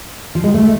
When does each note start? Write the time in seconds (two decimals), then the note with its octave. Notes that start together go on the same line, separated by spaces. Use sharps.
0.35 F3
0.44 G#3
0.54 A3